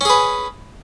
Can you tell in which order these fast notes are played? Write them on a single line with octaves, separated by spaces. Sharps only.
C#4 G#4 B4